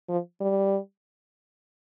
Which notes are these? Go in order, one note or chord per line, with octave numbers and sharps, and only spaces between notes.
F3
G3